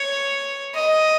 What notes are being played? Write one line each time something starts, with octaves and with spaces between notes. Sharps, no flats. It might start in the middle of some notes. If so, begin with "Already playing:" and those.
Already playing: C#5
D#5